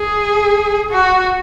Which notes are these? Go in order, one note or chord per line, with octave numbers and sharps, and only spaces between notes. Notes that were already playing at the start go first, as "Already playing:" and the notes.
Already playing: G#4
F#4